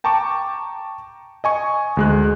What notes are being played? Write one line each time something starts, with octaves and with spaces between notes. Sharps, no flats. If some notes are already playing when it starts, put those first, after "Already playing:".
G5 A5 A#5 C#6 D6
D#5 G#5 C#6
D2 G#3 F#6